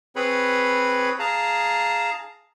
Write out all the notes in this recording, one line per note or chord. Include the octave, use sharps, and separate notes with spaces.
C4 G#4 B4 C#5 B5
G#4 F5 A5 A#5